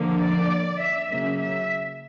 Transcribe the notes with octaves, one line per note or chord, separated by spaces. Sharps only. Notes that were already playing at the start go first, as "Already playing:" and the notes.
Already playing: D3 F3 A#3
D5
E5
C#3 F#3 A#3 E5
E5